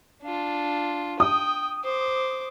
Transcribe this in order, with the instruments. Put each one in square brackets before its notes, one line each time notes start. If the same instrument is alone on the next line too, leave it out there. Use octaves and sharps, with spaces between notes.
[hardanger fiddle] D4 F4
[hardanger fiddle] G5 [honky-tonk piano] D#6
[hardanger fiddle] C5 D6